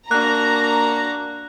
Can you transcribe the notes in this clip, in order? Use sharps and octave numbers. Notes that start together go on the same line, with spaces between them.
A#3 D4 F#4 A#5 F#6